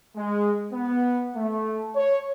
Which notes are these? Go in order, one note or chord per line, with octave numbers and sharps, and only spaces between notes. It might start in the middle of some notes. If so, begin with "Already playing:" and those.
G#3
B3
A3
C#5